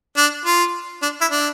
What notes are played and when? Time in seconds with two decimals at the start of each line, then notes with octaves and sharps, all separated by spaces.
0.17 D4
0.46 F4
1.02 D4
1.21 E4
1.31 D4